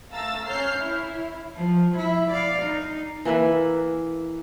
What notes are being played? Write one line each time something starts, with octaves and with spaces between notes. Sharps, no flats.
A3 F5 A#5 E6 A6
C#4 C#5 F6 G6 C7
E4
F3
E4
D5 F5
D#4
E3 A#3 E4 B4